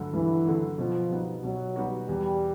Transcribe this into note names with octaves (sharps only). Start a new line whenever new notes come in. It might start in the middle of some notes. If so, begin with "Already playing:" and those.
Already playing: G2 D3 F#3 A3
G2 E3
D3 F#3 A3
B2 F3
G3 B3 D#4 F#4
B2 F#3
G3 B3 D#4 F#4
E2 G3